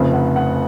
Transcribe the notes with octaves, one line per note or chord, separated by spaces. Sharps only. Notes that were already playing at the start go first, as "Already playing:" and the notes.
Already playing: F1 F2 C#3 F3
F#5
F#5